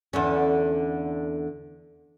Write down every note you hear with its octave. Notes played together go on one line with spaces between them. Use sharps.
E2 D3 C#4